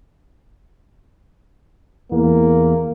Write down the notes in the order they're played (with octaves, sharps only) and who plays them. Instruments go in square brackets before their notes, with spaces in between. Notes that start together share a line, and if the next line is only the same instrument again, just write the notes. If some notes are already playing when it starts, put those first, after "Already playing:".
[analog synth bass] E2 [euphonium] A#3